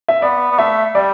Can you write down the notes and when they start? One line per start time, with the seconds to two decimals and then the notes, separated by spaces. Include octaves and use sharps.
0.08 E5
0.22 B3 D5
0.51 B3
0.59 A3 E5
0.95 G3 D5